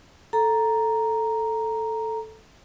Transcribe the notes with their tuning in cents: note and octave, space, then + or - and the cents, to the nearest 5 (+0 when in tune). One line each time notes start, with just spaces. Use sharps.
A4 +0 A#5 +0